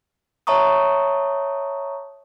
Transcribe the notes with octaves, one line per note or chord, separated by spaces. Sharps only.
C#5 E5 A5 A#5 C#6 D#6